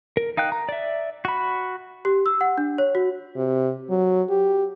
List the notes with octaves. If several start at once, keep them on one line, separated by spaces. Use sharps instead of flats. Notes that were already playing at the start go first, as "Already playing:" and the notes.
A#4
D#4 F5 G5 F#6
A#5
D5 E5
F#4 B5
G4
E6
F#5
D4
C#5
F#4
C3
F#3
G4